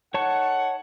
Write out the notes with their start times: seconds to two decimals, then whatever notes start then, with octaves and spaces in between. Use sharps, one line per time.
0.14 D#4 A4 C#5 F#5 A5 C#6